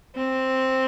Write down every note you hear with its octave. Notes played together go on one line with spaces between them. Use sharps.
C4